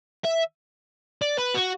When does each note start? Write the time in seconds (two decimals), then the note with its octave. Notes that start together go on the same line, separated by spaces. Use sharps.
0.24 E5
1.22 D5
1.38 B4
1.54 F#4